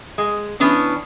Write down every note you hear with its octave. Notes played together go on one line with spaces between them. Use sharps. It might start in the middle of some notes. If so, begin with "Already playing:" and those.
G#3
E3 B3 C#4 D4